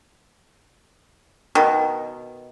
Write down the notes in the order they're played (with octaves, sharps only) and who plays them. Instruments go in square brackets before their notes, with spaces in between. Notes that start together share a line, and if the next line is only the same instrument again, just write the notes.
[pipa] B2 D#3